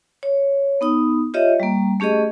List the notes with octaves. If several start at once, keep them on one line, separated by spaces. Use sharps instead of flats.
C#5
B3 D#4 D#6
F4 G4 C#5 D#5 E5
G3 A#3
A3 C#4 G4 G#4 D#5